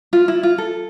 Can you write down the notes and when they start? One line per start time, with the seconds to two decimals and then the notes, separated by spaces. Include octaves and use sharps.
0.13 F4
0.28 E4
0.43 F4
0.58 A4